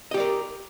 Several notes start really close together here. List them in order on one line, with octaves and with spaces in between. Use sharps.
D#5 G4 D5 A#4